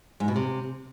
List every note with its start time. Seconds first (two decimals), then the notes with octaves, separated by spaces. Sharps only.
0.20 G#2
0.28 B2
0.36 C3